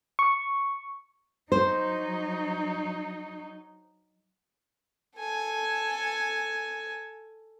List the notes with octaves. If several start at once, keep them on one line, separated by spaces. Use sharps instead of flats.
C#6
F#3 D#4 C5
A4 G#5